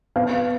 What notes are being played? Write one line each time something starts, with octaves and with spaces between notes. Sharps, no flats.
B3 F5